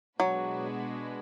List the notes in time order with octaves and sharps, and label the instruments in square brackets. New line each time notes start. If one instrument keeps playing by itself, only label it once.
[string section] B2 G#3 D4 F#4 B4 [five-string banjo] F#3